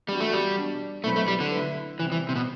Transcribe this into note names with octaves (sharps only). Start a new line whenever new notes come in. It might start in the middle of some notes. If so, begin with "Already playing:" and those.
E3 G3 B3 D4 F#4
A3
G3
B2 G3 D4
B2 F#3 A3 C4 E4 B4
A3
G3
D3
A3 E4 B4
C3 E3 G3 C4
E3
C3
B2